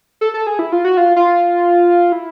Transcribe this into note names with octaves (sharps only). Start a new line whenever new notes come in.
A4
A4
G#4
E4
F4
F#4
F4
F4
E4